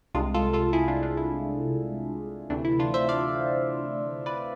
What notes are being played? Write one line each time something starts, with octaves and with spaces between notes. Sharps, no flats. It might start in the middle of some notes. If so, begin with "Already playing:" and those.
C2 C3 G#3 D4 F4
F4 A4
F4 A4
E4 G#4
D4 F4
D4 F4
E4
D2 C3 E3 A3 D4
E4
D4 F4
C5 E5
D5 F5
B4 D5